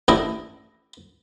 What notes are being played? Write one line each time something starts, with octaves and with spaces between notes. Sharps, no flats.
A1 D4 E4 D#5